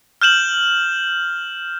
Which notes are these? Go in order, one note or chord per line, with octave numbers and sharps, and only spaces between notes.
F6 G6 E7 F#7